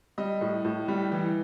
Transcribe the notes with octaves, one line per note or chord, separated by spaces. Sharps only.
G3 D#5
A2
A2
G3
E3